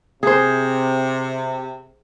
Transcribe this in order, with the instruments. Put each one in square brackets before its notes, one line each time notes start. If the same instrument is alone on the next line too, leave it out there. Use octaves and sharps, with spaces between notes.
[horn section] C3 [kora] G#4 C5